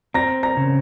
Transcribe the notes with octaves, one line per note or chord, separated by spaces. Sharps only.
C4 A#5 A#6
A#5 A#6
C#3